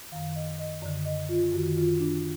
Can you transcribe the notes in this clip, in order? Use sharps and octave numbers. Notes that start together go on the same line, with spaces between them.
F#2 D#3 F5
D#5
D#5
F#2 D3 D5
D#5
F4
F#2 D#3 F#4
F4
D4